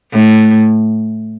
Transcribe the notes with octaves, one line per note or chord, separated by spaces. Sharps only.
A2